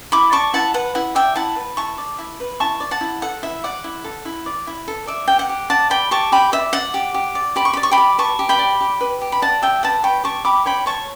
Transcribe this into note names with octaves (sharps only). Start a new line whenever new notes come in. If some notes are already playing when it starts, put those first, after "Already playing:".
E4 B5 D6
D5 A5 C#6
E4 F#5 A5
B4 F#5
E4 F#5
D5 E5 G5
E4 F#5 A5
B4
E4 A5 C#6
D5
E4
B4
E4 A5 C#6
D5
F#5 A5
E4
A4 F#5
E4 E5
D5 F#5
E4
A4
E4
D5
E4
A4
D5 E5
G4 G5
F#5
G4
D5 F#5 A5
D5 G5 B5
G4 A5 C#6
G4 G5 B5
D5 E5
D5 F#5
G4
G4
D5
G4 B5
C#6
B5
D5
C#6
G5 B5
G4
B4 A5 C#6
G4
G5 B5
D5
G4
B4
G4
B5
D5 F#5 A5
G4 E5 G5
B4 F#5 A5
C#5 G5 B5
G4 A5 C#6
G4 B5 D6
C#5 G5 B5
C#5 A5 C#6